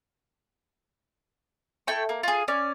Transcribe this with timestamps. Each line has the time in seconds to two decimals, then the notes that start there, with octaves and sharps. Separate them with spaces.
1.87 A3 E4 G5 C#6
2.09 A#3
2.23 F4 G#4
2.48 C#4 D5